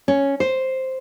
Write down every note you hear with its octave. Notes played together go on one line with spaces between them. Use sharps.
C#4
C5